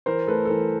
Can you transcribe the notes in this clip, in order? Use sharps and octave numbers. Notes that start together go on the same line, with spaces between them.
E3 A#4 C5
A3 A4 B4
A4
E3 A#4